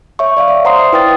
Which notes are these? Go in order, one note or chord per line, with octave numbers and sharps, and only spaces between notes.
C#5 E5 C#6
D5 E5 F5
D5
C5 F#5 A#5 C6 D#6 C7
E4 B4 G5 D#6 A6